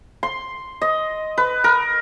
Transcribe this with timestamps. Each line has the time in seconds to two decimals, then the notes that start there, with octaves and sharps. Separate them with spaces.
0.23 C6
0.81 D#5
1.38 B4
1.64 A#4